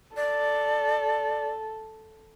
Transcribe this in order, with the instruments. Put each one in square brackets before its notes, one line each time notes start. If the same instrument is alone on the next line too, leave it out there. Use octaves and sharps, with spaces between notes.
[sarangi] A4 [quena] D5